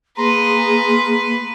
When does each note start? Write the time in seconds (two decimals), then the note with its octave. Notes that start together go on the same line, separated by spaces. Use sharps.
0.18 A#3 G#4 B4 A#5 C6